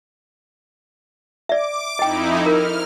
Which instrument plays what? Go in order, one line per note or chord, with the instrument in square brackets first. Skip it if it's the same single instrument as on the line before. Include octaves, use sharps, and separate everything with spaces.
[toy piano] D5 E5 [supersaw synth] D6
[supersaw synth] F2 D#4 E4 [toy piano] D#5 G5
[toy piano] A#4 [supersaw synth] F6